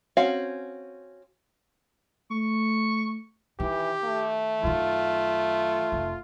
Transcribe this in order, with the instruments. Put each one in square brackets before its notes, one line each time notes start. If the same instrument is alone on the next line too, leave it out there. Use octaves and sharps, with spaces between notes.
[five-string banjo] C4 C#4 F#4 F5
[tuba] A3 [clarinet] C#6
[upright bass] D#3 [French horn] E3 [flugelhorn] G4
[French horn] A3
[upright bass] F#2 D#3 [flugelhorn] F4
[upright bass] F1